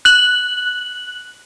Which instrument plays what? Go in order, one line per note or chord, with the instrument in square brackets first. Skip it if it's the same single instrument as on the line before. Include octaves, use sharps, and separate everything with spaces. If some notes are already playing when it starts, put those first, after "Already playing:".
[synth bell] F#6 F#7